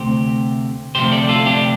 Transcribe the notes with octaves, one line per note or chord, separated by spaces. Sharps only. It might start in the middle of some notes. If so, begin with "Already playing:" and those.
Already playing: D2 C3 A3 G4 C5
D2 C3 F3 A3 G4 C5
A4 D5
F4 A4
D4 G4